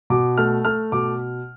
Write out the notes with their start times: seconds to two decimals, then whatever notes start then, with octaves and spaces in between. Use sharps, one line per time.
0.10 B2 D6
0.38 A3 F6
0.65 A3 F6
0.92 B2 D6